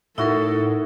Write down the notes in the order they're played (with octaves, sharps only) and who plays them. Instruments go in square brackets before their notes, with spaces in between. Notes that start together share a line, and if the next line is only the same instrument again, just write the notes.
[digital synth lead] A2 [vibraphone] D#4 A#4 [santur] E4 F#4 [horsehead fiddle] A4